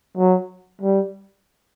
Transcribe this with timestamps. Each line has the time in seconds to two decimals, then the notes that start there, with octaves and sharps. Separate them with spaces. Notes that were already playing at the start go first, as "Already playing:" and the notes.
0.17 F#3
0.81 G3